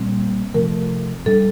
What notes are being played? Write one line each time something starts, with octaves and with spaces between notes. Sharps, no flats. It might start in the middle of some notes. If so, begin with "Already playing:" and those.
Already playing: A#2 G3 C4
C3 F3 A3 A#4
A2 G3 D4 A4